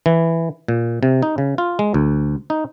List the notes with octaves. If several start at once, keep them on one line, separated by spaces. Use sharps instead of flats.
E3
A#2
C3
D#4
C#3
F4
G#3
D2
D#4